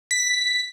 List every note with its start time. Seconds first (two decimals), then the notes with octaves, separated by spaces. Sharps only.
0.11 B6